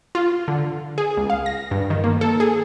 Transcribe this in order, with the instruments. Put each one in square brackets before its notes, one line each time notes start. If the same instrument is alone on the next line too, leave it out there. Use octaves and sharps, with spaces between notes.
[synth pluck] F4
D3
G#4
C#2
F5
A#6
G2
D#3
A#3
A4
G#4